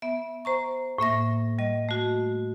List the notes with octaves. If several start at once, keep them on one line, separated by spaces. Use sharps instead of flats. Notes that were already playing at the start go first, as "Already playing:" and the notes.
B3 E5
C5 A#5 C#6
A2 A#3 E5 A#6
G3 D#5
A3 F#4